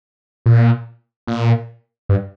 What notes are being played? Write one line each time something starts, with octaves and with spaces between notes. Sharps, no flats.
A#2
A#2
G2